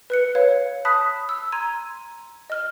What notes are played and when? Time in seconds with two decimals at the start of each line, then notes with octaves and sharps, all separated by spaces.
0.10 B4 F#6 C#7
0.35 B4 C#5 F5
0.85 A5 B5 D#6 F#6 B6
1.29 E6
1.52 A#5 C6 G#6 D#7
2.50 D#5 F6